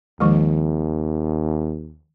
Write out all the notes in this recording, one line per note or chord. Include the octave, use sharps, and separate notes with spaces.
D#2 D#3 F3 G#3